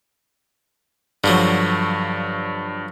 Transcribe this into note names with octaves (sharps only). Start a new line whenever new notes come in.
G2 D3 F3 F#3